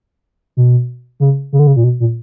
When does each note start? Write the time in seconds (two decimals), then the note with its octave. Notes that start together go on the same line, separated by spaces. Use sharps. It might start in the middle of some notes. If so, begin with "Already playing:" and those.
0.57 B2
1.20 C#3
1.53 C#3
1.59 D3
1.67 C#3
1.76 A#2
1.84 B2
2.00 A#2